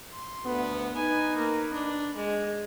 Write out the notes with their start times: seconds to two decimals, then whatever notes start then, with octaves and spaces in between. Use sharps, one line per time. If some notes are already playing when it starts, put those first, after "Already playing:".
0.13 C6
0.45 D2 B3
0.95 D#4 B4 G#5
1.37 A#3
1.73 D4
2.16 G#3